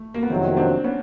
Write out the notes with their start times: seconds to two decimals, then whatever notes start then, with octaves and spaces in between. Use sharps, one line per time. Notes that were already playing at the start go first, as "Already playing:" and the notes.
Already playing: A3
0.14 A#3
0.23 B3
0.30 F2 C3 D#3 F#3 A#3 C4
0.57 C4 D4
0.84 B3 C#4